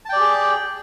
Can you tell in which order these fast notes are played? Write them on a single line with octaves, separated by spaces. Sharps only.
A5 G5 D5 G4 G#4